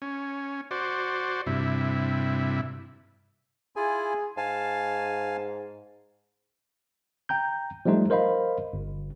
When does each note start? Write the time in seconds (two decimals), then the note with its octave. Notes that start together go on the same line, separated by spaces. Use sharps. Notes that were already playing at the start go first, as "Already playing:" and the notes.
0.02 C#4
0.71 F#4 C5 D5
1.47 G2 C3 E4
3.76 E4 F4 G#4 G#5
4.37 G#2 F5 G#5 A5
7.29 G5 A#5 G6
7.86 F3 G3 A3 D#4 C5
8.10 A#4 C5 D#5 F5 B5
8.73 G1